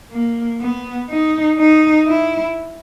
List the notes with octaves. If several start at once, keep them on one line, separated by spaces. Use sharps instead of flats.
A#3
B3
D#4
D#4
E4